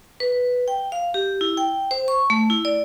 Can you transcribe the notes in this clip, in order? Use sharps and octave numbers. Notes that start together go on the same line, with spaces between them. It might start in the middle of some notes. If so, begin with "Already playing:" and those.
B4
G5
F5
G4
E4
G5
C5
C#6
A3
E4
D5